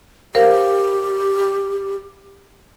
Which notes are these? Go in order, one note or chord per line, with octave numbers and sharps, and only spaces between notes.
G4 A#4 C5 F5